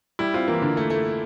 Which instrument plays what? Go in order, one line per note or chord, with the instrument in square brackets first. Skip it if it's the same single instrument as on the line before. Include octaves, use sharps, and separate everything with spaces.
[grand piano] G3 [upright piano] E4
[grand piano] C4 [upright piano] F4
[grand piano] E3 [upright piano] A#3
[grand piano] D3
A3
A3